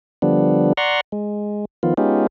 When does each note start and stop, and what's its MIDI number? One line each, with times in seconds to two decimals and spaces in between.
0.22 0.73 50
0.22 0.73 53
0.22 0.73 55
0.22 0.73 59
0.22 0.73 62
0.77 1.01 74
0.77 1.01 78
0.77 1.01 82
0.77 1.01 84
0.77 1.01 85
1.12 1.65 56
1.83 1.94 51
1.83 1.94 53
1.83 1.94 59
1.83 1.94 65
1.97 2.27 56
1.97 2.27 59
1.97 2.27 61
1.97 2.27 63
1.97 2.27 65
1.97 2.27 67